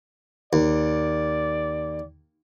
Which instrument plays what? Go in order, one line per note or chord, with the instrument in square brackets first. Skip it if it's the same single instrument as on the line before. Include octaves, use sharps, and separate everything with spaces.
[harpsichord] D#2 [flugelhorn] D5